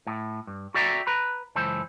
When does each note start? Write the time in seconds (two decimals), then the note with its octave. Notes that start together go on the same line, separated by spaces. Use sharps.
0.07 A2
0.47 G2
0.74 F#4 A4 D5 E5 G5 A#5
1.07 B4 A#5 B5
1.56 C#2 F#2 E3 A4 C5